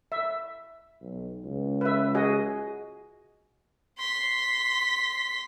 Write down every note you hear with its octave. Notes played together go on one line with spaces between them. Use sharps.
E5
B1
C#2
B4 E5
F#4 G#4 D#5
C6 B6